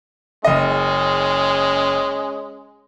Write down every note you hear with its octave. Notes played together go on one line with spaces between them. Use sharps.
F#1 G#3 C#4 D#5